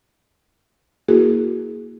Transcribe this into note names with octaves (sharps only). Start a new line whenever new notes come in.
A#3 E4 F#4 G#4 A#4